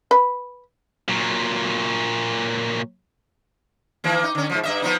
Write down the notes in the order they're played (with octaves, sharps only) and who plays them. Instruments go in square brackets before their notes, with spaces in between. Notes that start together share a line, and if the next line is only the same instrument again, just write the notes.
[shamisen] B4
[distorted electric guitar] A#2 F#3
[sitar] D#3 E3 A#3
D#4
D3 C#4
G#2 D3 F3
G2 D#5 E5
F3 B3 D#4